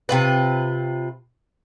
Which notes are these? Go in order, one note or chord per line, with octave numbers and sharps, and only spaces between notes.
C3 F4 B4